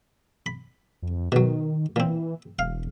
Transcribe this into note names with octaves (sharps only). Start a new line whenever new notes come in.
B5
F2
B2 D#3 F#3
A#2 E3 C4
E1 F5